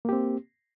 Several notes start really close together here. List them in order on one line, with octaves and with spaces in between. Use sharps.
A#3 G4 C4